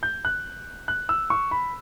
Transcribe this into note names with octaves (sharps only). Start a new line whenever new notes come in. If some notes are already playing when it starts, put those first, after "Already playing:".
G6
F#6
F#6
E6
C#6
B5